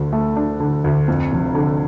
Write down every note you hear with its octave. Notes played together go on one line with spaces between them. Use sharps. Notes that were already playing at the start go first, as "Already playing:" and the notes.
Already playing: D2 D3
A3
D4
D3
D2
F2
F1
D3